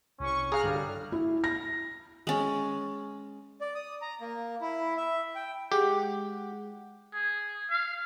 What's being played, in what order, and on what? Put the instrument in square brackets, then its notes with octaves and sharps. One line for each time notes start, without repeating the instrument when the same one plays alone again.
[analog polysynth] C2 C#6 [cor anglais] C#4
[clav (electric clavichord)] G#4 F5 [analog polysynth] A#5 F6 F#6
[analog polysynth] G2 D3 [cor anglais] G3
[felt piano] E4
A#6
[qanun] G#3 C#4
[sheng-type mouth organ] D5
D#6
A#5
A#3
E4
E5
G5
[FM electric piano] G#3 F#5 [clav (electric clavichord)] G4
[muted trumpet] G#4
F5